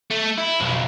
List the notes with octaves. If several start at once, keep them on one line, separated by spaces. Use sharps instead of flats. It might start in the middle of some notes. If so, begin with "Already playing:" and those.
A3
E4
B1 F2